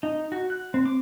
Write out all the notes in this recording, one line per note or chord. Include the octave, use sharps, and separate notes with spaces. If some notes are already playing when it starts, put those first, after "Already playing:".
D#4
F#4
F#6
C4
D6